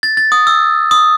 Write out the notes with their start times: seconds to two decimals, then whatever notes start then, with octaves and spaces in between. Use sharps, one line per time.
0.03 A6
0.17 A6
0.32 D#6
0.47 E6
0.91 D#6